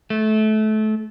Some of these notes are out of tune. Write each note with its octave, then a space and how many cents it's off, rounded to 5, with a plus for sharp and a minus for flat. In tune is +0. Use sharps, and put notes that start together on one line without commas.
A3 -25